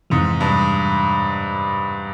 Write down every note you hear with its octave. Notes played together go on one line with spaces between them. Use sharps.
F2 G#2 C3 E3
G2